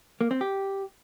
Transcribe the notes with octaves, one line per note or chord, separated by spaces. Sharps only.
A#3
C4
G4